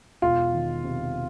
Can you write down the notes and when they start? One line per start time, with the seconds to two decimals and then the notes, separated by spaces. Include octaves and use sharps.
0.22 E1 F4
0.53 D#3
0.84 C3